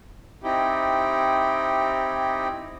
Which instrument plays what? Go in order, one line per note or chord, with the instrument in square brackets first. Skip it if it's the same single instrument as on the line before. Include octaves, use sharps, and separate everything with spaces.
[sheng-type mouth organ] C4 D#4 E4 G4